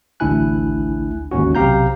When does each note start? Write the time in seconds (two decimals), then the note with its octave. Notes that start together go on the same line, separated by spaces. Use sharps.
0.20 A1 D2 D4 E4 G#5 F#6
1.31 G1 D#2 G#2 C#4 F#4
1.55 B1 C3 G4 F5 A#5 G6